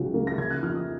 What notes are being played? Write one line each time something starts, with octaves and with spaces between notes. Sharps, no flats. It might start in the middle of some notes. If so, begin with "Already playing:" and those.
Already playing: C#2 C#3 F#3
A#3
A#6
C#3 G#6
F#6
F2 F6
D#6